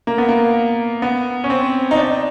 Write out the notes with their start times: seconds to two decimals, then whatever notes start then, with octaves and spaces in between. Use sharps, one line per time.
0.07 A#3
0.18 B3
0.29 A#3
1.02 B3
1.44 C#4
1.50 C4
1.91 D#4
1.97 D4